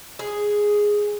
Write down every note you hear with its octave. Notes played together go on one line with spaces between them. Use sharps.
G#4